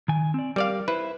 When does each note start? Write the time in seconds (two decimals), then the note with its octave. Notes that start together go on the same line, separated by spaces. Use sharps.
0.08 D#3 G#5
0.34 C4 D5
0.56 G3 A#4 D5 F5
0.88 E4 B4 C5